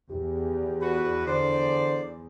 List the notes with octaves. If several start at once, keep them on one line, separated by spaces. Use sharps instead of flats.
E2 G4
F#4 B4
D3 C5 D5